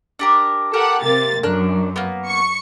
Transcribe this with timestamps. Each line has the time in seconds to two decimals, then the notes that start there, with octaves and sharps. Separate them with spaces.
0.19 D4 G4 A#4
0.74 G4 A4 A#4 F#5
1.03 C3 A#3 A6
1.43 F#2 D4 A#4 F#6
1.96 A#3 B3
2.28 C#6 C#7